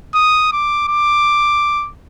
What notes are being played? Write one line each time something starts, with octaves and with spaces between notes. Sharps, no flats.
D#6
D6
D6